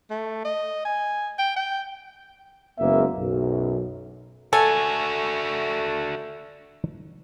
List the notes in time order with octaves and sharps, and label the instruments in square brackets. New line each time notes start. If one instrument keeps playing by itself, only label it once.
[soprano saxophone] A3
D#5
G#5
G5
G5
[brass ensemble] F#1 G#3 A#3 B3 E5
B1 F#2
[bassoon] A3 [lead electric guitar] D4 F#4 [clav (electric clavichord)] A4 [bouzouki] G#5